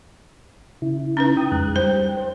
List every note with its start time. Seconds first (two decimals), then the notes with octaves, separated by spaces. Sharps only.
0.82 C#3 E4
1.17 C#4 D#4 B4
1.37 G5 D#6
1.52 F2 G#3 F#6
1.76 G3 C5 G5
2.17 C5